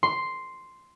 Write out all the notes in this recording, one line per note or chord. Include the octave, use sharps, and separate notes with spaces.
C6